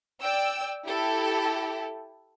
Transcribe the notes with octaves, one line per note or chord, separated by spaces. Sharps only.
D5 G5 E6
E4 G4 A4